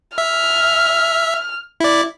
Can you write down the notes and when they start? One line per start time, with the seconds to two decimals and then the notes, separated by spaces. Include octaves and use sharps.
0.18 E5 F6
1.80 E4 D5